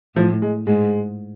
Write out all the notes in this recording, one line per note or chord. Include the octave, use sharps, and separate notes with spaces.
A2 F3
G#3
G#2 G#3